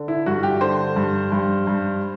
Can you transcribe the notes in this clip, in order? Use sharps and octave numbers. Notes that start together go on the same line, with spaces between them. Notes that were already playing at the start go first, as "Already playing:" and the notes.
Already playing: D3
E4
G2 F#4
G4
D3 C5
G2
G2
G2